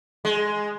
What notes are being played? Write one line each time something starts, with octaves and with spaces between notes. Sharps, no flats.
G#3